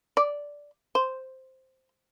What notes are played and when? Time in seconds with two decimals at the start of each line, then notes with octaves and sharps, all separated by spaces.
0.17 D5
0.95 C5